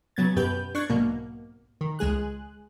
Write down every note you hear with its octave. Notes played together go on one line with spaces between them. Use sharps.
C#3 F#3 B3 G#6 A6
F#2 B2 G4 B4 G6
D4 C#6 F#6 G#6
B1 G#2 B2 A#3
D#3
C#2 G#3 G#4 F#6